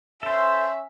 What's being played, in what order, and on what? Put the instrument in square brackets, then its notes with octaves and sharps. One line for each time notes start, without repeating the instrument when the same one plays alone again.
[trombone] C#4 [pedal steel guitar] A4 C5 [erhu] E5